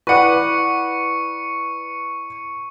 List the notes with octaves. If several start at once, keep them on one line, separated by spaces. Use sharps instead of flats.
E4 B4 D5 F#5 C#6 D6 C#7